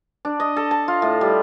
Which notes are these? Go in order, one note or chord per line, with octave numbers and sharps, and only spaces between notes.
D4
D#5
A4
A5
F4
A2
G3